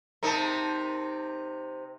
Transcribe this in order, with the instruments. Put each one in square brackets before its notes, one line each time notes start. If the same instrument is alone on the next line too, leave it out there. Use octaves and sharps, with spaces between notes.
[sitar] C3 D#4 [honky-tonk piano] A#4 A5